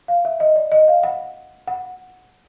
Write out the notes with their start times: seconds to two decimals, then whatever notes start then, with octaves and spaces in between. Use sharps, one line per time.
0.08 F5
0.25 E5
0.40 D#5
0.56 D5
0.72 D#5
0.88 F5
1.03 F#5
1.67 F#5